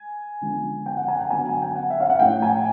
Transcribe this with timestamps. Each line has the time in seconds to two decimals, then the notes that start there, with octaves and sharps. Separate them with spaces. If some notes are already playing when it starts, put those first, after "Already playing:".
Already playing: G#5
0.41 D3 F3 G#3 B3
0.86 G5
0.97 F#5
1.08 G#5
1.19 G5
1.30 D3 F#3 B3 G#5
1.49 G#5
1.62 G5
1.76 F#5
1.90 E5
2.00 F5
2.10 F#5
2.19 A2 F3 A3 G5
2.42 G#5